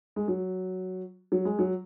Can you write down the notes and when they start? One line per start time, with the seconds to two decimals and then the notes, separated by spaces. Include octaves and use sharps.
0.16 G#3
0.28 F#3
1.32 F#3
1.45 G#3
1.59 F#3